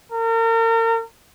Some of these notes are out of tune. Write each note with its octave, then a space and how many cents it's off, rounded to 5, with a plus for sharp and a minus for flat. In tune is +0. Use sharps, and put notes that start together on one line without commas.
A#4 -40